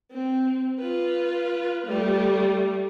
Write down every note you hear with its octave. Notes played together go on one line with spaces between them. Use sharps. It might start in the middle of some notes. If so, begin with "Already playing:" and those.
C4
F4 B4
G3 A3